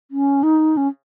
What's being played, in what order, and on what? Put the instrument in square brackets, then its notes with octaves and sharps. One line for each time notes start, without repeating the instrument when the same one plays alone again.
[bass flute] C#4
D#4
C#4